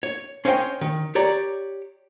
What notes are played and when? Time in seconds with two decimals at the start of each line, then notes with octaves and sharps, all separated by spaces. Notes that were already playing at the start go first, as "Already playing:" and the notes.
0.03 C#5
0.45 C#4 C5 C#5 D#5 E5 G5
0.81 D#3
1.15 G4 C#5 D5 A#5